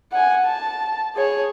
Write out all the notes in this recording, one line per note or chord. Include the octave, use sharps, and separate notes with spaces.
F#5 G#5
A5
G#4 C#5